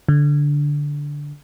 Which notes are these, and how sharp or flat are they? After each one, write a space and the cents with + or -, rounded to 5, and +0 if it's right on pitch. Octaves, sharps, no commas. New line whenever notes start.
D3 -10